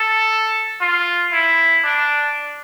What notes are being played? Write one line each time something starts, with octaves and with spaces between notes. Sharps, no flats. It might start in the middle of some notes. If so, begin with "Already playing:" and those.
Already playing: A4
F4
E4
D4